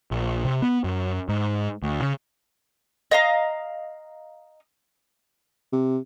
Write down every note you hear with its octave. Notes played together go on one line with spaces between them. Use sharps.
A#1
C3
B3
F#2
G#2
D2
C#3
D#5 F5 A#5
C3